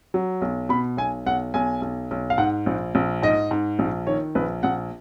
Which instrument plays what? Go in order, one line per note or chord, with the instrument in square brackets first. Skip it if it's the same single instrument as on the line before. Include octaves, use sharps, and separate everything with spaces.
[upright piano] F#3
B1
B2 B5
B1 G#5
B1 F#5
B1 G#5
B1
B1
F5
G#2 F#5
A#1
A#1
G#2 D#5
G#2
A#1
D#3 C#5
A#1 B4
A#1 F#5